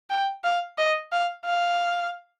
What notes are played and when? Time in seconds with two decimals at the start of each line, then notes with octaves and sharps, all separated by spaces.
0.10 G5
0.44 F5
0.78 D#5
1.12 F5
1.45 F5